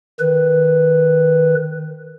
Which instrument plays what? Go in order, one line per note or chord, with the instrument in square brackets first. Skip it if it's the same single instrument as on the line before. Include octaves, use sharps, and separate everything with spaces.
[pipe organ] D#3 B4